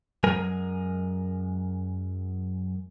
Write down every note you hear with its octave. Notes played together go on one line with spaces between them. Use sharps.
F#2 F#3 G#3 A#4 G#5